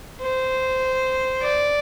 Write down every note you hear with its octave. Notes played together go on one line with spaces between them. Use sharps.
C5
D5